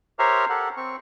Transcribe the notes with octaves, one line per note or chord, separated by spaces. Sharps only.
G4 A#4 C5 C#5 E5 A#5
G4 A4 A#4 F#5
C4 C#6